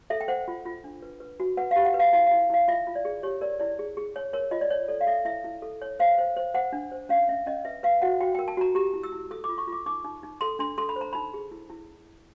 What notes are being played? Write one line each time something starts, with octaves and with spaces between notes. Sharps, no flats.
A4 E5
G5
C5 F#5
F4
F4
D4
B4
B4
F#4
B4 F#5
G4 F5
F#5
B4
F5
E4 F5
E4 F5
E4 F5
F4 E5
F4
D5
G#4
G4 C#5
A#4 D5
E4 D5
G#4
G#4
C#5
A#4 C#5
F4 D#5
D5
C#5
A4 D5
F5
A4 E5
E4 E5
E4
A4
C#5
C5 F5
C5
C5
C5 F#5
D4
C5
C#4 F5
C#4 E5
C#4 D#5
B4 E5
B4 F5
F#4 F#5
F#4 G5
A#4 G5
A5
F#4 A#5
G4 A#5
E4
E6
E4
A4 D#6
D6
F4
C#6
F4
D6
D#4 D6
D#4
D#4
A4 C6
D4 C6
A4 C6
B5
C5
A#5
D#4 B5
G#4
E4
E4